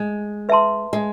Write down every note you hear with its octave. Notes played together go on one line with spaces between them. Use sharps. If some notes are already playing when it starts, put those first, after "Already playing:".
Already playing: G#3
B4 E5 A5 C6
G#3